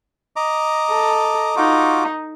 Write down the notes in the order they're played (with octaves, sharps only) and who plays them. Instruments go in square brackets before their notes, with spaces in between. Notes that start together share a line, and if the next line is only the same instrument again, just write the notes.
[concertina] D#5 A#5 D6
[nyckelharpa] A4
[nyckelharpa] D#4 [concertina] F4 F#4 D6